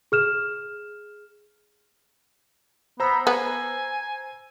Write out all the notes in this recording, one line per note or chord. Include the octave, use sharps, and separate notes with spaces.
G#4 F6 E7
B3 C5 A#5 E6
B3 G#5